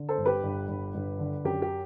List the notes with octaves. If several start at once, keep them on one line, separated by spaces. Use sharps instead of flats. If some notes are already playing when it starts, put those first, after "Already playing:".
Already playing: D3
A4 C5
G1
G4 B4
G1
G1
G1
D3
F#2 G4
G4